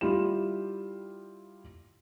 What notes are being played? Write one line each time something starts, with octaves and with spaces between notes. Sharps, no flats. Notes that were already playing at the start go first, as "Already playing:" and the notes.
G3 E4 F4 G4 E7